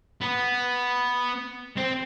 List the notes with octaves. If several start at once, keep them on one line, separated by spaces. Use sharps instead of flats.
B3
C4